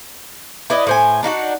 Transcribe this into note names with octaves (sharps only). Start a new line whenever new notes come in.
E4 B4 D5 D#5
A2 C5 G#5
D4 D#4 F4 F#4